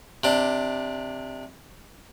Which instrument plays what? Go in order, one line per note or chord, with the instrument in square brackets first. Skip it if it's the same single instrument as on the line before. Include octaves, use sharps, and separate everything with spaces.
[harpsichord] C3 D4